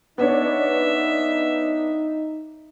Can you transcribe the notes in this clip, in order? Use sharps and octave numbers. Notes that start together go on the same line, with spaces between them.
B3 D4 D#4 C#5 E5